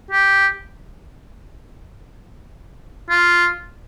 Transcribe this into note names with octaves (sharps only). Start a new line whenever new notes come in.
G4
F4